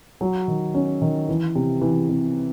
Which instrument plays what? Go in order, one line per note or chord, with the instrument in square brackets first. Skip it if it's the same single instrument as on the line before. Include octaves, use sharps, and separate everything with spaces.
[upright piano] F#3
D#3
C#4
D#3
E3
C3
E3
C3